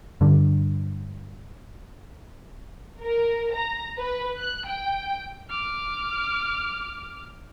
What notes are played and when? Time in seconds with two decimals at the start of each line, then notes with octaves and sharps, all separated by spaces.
0.21 G2 D3
3.02 A#4
3.53 A#5
3.99 B4
4.37 F#6
4.67 G5
5.49 D6 F6